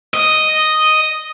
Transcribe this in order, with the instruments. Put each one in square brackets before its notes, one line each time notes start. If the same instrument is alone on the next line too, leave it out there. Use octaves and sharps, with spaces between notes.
[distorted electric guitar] D#5